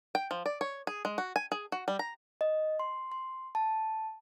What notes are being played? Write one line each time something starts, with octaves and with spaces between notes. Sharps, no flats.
G5
F3
D5
C#5
G#4
G#3
F#4
G#5
G#4
F#4
G3
A#5
D#5
C6
C6
A5